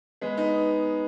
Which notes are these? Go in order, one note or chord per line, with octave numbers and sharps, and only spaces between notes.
G#3 B3
B3 D#4